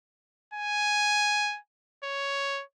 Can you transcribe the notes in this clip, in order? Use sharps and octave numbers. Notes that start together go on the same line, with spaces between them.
G#5
C#5